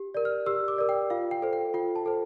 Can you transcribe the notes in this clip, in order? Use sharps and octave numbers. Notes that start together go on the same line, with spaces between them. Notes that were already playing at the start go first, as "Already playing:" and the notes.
Already playing: G4
A#4 D5
F6
G4 E6
D6
A#4 D5
G5
F4 F5
G5
A4 C5
G5
F4 G5
A5
A4 C5